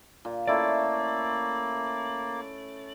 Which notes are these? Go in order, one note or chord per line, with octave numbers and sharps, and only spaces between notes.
A#2
A3 A#3 C#4 E4 D5